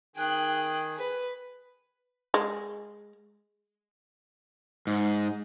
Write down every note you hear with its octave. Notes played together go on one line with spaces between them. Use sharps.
D#3 G#4 G5 F#6
B4
G#3
G#2